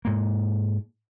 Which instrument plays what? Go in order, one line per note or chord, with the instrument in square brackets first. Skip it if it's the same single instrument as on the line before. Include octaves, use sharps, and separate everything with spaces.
[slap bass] G#2 A#3